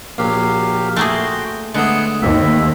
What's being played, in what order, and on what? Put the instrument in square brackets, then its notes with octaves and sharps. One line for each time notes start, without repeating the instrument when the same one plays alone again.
[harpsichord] A#1 [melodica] F#3 G4 F5
[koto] A3 A#3 G#4 [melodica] F#4 G5 C6
[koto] D3 [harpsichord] G#3 A3 [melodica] B3 G#4 F#5
[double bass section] D#2 [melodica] A#3 C4 E5